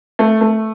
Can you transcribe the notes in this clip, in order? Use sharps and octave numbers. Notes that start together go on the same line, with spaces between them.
A3
A3